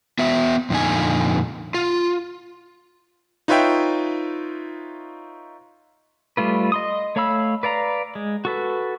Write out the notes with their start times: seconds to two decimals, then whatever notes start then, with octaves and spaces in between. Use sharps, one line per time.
0.19 B3 F#4 E5
0.70 F2 A#2 D3 D#4 G#5
1.74 F4
3.48 D#4 F4 B4 C#5 E5 G5
6.37 G3 A3 F4 B4
6.72 D#5 C6 D#6
7.16 A3 C#5 F5 B5 E6
7.63 B4 D5 F5 A#5
8.15 G#3
8.45 F#4 A4 B4